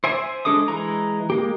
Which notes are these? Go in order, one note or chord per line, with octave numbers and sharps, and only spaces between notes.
C5 D5 E5 G#5
G#3 D4 A4 D6 D#6
E3 G#3 A#5
G#3 A#3 G4